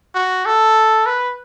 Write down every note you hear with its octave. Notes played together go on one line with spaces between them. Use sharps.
F#4
A4
B4